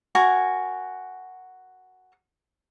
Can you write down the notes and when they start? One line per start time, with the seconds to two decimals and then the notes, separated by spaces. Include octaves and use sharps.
0.15 F#4 A#4 G#5